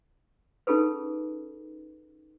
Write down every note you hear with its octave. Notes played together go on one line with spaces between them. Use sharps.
C#4 D#4 F4 G#4 A4 B4